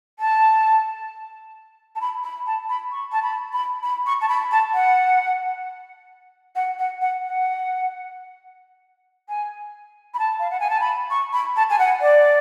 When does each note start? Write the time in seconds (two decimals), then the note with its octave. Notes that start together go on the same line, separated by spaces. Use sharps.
0.19 A5
1.95 A5
2.01 B5
2.24 B5
2.47 A5
2.69 B5
2.92 C#6
3.12 A5
3.23 B5
3.53 B5
3.83 B5
4.06 C#6
4.21 A5
4.29 B5
4.51 A5
4.74 F#5
6.56 F#5
6.79 F#5
7.01 F#5
7.24 F#5
9.29 G#5
10.14 B5
10.19 A5
10.40 F5
10.51 F#5
10.60 G#5
10.70 A5
10.81 B5
11.10 C#6
11.33 B5
11.56 A5
11.70 G#5
11.79 F#5
12.01 D5